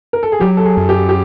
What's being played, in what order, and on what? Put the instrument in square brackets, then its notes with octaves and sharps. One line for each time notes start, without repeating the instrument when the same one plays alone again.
[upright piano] A#4
A4
G#4
[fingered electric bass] F#3 [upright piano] G4
[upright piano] A4
G#4
[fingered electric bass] F#2
[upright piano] G4
G4